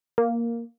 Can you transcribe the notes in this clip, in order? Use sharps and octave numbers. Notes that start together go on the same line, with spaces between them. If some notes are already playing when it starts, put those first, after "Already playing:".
A#3